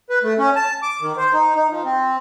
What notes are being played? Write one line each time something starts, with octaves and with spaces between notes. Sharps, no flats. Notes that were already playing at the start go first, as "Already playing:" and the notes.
B4
A3
C#4
A5
D6
D#3
C5
D#4
D#4
F3
C4